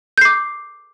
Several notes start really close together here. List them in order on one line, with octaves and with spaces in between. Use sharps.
G6 C7 D6